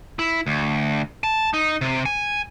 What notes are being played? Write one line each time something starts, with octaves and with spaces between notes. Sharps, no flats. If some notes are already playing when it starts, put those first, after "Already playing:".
E4
D2
A5
D#4
C3
G#5